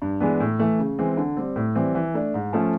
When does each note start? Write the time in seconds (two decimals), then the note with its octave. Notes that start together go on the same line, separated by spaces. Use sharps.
0.02 G2
0.20 E3 G#3 B3 D4
0.40 A2
0.59 E3 A3
0.79 C#3
0.98 E3 G#3 C4
1.17 D3
1.37 G3 C4
1.56 A2
1.75 E3 G3 C4
1.95 E3
2.14 A3 D4
2.34 G#2
2.53 F3 A3 C#4